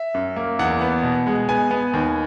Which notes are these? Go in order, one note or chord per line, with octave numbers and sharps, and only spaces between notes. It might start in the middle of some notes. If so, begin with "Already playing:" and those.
Already playing: E5
F#2
A#3
E2 F#5
B3
B2
G#3
B3 G#5
B3
D#2